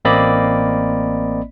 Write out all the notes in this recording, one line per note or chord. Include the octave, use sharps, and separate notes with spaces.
A1 A#3 C4 D5 D#5 B5